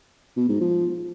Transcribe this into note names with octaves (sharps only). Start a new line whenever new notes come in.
B2
G#2
F3